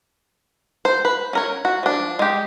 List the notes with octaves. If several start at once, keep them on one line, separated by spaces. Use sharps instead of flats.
C5
B4
C#4 A#4 C#5
F#4
F3 D4
G#3 G4